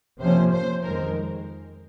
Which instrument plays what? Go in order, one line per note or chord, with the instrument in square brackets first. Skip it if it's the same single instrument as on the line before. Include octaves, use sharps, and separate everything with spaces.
[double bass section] C3 F3 A#3 C#4 [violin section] C5
[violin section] C5
[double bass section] F2 D#3 G#3 [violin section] A#4